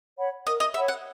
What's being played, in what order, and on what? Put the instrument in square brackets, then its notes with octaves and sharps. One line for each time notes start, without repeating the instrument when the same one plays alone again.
[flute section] C#5 F#5 B5
[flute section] A#4 [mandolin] D#5
[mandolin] D#5
[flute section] C#5 F#5 B5 [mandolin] E5
[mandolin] F#5